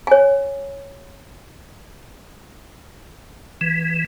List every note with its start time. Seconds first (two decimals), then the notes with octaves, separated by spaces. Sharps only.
0.07 C#5 G#5
3.61 E3